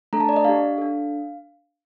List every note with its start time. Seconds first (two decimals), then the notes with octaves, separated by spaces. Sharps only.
0.13 A3 D4 A4 A#5
0.20 A5
0.29 D5
0.36 D#5
0.45 D4 G4 F5
0.78 D4 A4